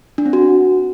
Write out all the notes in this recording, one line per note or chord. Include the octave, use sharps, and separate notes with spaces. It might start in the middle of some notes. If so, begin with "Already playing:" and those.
D4
C4
F#4